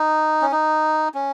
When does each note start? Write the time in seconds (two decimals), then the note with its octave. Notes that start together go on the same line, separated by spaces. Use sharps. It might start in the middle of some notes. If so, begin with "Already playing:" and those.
Already playing: D#4
0.42 C#4
0.52 D#4
1.14 C#4